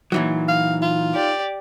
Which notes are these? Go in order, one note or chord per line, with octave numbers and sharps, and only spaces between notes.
A#2 E3 F#3 D#4
F5
F4
G4 D5